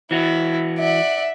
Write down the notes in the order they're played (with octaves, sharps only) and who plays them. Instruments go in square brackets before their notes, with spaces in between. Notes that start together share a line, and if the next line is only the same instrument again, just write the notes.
[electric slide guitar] E3 F#4 [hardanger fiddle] E4
[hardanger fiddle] D5 F#5 [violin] E5